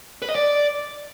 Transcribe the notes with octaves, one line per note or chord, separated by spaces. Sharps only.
B4
D#5
D5